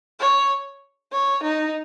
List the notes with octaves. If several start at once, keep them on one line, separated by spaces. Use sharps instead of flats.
C#5
C#5
D#4